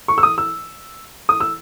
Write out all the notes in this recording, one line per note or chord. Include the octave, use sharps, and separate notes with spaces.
C#6
E6
D#6
E6
D#6
E6